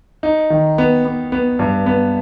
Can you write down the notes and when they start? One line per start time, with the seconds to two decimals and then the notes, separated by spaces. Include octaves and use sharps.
0.23 D#4
0.50 D#3
0.78 B3
1.05 B3
1.32 B3
1.59 G2
1.86 B3